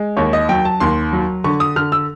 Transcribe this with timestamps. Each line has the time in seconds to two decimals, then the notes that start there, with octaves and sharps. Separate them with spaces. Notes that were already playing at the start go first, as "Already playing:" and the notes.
Already playing: G#3
0.17 D#2 C#5
0.33 D#5
0.49 F#3 G5
0.65 A5
0.80 D#2 C6
1.13 F#3
1.44 D3 C#6
1.60 D#6
1.76 D3 F6
1.92 E6